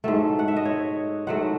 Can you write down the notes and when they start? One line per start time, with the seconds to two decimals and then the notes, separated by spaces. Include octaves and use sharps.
0.04 G#2 F#3 A3 A4
0.39 F#5
0.48 E5
0.56 D#5
0.65 C#5
1.27 G#2 F#3 A3 F#5